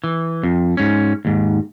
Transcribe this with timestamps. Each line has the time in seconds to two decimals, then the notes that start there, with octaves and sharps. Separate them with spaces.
0.04 E3
0.43 F2
0.77 G#2 C#4
1.25 D#2 G#2